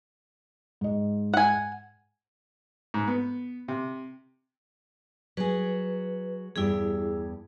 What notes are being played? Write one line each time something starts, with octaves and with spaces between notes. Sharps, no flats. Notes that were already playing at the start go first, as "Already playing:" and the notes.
G#2 D#5
F#5 G#5
G#2
B3
C3
F#3 G#4 B4
E2 G2 E4 G4 G#4